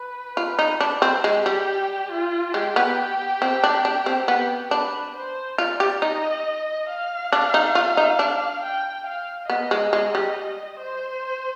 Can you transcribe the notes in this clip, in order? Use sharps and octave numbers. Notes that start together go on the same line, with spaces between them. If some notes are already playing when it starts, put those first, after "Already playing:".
Already playing: B4
F4
D#4
D4
C4
G#3 G4
G3
F4
G#3 G4
B3
C4
D4
D4
C4
B3 G4
D4 B4
C5
F4 D5
G4
D#4 D#5
F5
D4
D#4
F4
D#4
D4
G5
F5
B3 D#5
G#3
G#3
G3
C5